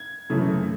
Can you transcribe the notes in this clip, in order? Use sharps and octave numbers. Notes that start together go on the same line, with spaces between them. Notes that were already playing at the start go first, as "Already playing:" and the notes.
Already playing: G#6
F#2 C#3 E3 A3